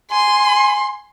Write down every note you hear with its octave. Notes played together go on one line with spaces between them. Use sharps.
G#5 C6